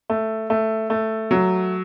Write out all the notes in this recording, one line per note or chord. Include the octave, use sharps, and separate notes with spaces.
A3
A3
A3
F#3